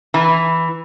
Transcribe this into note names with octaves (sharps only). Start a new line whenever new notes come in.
E3